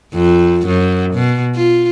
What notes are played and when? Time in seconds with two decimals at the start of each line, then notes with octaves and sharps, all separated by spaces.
0.14 F2
0.67 F#2
1.15 B2
1.55 F4